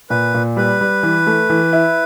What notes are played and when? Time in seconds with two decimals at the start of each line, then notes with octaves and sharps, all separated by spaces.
0.10 A#2 B4
0.34 A#2
0.57 G3 B4
0.81 G3
1.03 E3
1.27 A3
1.50 E3
1.73 E4